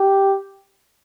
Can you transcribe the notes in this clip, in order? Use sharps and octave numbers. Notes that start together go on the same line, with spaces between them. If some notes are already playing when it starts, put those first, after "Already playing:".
Already playing: G4